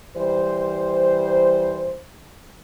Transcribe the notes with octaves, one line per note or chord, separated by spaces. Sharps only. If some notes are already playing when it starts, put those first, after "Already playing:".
E3 G3 C5